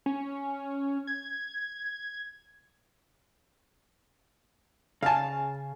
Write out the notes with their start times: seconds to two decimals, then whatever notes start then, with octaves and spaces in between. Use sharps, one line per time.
0.06 C#4
1.07 G#6
5.03 C#3 F5 G#5 A5